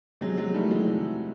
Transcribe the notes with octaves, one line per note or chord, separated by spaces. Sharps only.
C3 F#3 G#3
F#3 G#3
D#3 G3 A3
F#3 G#3
C3